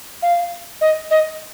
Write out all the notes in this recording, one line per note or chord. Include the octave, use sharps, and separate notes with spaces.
F5
D#5
D#5